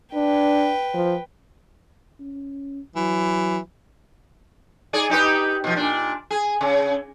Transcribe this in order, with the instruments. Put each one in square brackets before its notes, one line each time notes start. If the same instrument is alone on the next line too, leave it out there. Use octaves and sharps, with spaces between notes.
[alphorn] D4 [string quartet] B4 G5
[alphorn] F3
[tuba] C#4
[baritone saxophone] E3 [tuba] F#3
[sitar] D#4 G#4 D5
D#4 G4 B4
B2 F3
A#2 D4
G#4
C#3